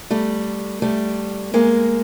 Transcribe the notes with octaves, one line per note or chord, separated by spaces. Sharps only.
G3 A3
G3 A3
G#3 A#3